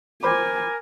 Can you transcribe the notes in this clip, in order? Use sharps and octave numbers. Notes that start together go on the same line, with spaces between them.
A#4 C5 G#5 B5 D6